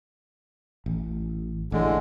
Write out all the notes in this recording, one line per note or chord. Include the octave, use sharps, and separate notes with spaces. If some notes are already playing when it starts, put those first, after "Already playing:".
A1
A1 A2 D3 G#3